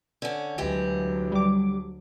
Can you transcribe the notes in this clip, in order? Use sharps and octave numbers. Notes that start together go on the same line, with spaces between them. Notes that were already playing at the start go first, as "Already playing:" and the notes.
D3 C#4
D2 E3 F#3 G#3 G4
G3 D6